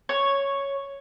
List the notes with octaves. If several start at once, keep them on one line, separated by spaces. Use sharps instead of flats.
C#5